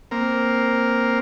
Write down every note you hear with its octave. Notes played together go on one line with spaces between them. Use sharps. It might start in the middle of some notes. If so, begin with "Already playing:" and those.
A#3 C4 A#4